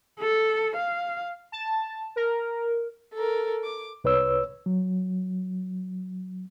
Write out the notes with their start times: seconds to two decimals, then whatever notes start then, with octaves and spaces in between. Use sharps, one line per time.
0.20 A4
0.76 F5
1.52 A5
2.16 A#4
3.14 A4 A#4
3.64 D6
4.04 C2 B4 C#5 E6
4.66 F#3